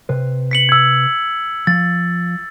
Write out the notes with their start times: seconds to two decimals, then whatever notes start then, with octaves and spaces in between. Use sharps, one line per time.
0.09 C3 B4 C5
0.51 B6 C#7 F#7
0.69 E6 G#6
1.67 F3 A6